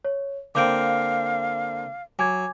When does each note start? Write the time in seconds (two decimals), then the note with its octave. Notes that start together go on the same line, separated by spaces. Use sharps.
0.05 C#5
0.55 D3 A#3 C4 F5 D6 G6 D7
2.19 F#3 G#5 D6 G#6